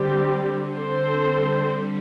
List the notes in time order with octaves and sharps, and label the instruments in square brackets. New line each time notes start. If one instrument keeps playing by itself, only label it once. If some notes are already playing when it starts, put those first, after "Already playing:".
Already playing: [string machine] D3 [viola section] G3 C4 G4
[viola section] C4 A4 C5
[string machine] D3 G3
D3 G3